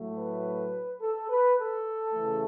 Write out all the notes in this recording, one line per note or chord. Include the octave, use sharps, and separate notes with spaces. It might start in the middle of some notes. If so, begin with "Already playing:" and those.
Already playing: A2 F#3 A3
B4
A4
B4
A4
C#3 E3 A3